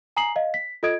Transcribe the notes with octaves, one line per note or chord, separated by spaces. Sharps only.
G#5 A#5 D#6 C7 F#7
D#5 F5
B6
F4 A4 D#5 D#6 G#6 D7